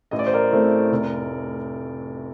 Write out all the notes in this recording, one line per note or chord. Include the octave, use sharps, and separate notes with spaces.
A1 D#5
D5
C5
A#4 D5
A2 A3 C4
F1